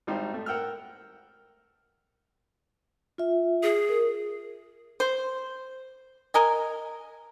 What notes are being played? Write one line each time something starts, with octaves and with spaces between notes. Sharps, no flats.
G#1 G3 D#4 C5
A3
A#4 F#5 G5 E6 F6
F4 E5
G#4
A#4
C5
A#4 D#5 G#5